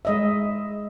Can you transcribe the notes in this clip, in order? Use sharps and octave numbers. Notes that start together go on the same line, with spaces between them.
G#3 D#5 E5